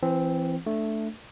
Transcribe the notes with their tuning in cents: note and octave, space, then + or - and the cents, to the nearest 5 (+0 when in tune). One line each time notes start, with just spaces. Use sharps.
E3 +25 C4 +0
A3 +0 D4 +10